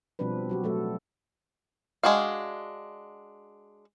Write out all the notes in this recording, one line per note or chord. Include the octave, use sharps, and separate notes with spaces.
B2 F3 G3 C4 D4 B4
F#3 F#4 G4
F#3 A3 A4
G#3 D4 F#4 F5